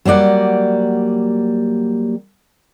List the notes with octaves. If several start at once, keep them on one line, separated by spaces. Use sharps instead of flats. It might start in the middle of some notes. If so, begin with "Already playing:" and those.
F#3 G3 A#3 D5 F#5